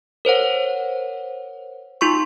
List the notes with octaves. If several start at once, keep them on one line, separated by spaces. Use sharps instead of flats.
A#4 C5 C#5 F#5
D#4 F4 C6 C#6